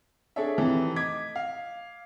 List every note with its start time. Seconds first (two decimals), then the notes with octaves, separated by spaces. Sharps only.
0.36 D4 G#4 A4 C#5 D5 E5
0.57 F2 C3 D#3 E3 A3
0.96 D#5 D6 G#6 B6
1.36 F5